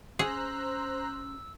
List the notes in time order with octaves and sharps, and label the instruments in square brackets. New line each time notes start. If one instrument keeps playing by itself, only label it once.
[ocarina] C#4 [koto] G#4 [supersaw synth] C5 A#5 F#6 [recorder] E6